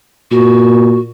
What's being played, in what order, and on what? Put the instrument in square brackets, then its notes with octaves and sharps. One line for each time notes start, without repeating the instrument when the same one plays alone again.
[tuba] A#2 [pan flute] F#4